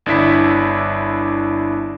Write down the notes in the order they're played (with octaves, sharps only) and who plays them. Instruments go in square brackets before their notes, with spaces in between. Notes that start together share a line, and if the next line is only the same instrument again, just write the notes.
[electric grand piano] G1 D4 E4 B6